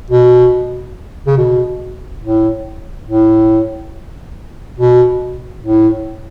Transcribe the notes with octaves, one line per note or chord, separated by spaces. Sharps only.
B2
C#3
B2
A2
A2
B2
A2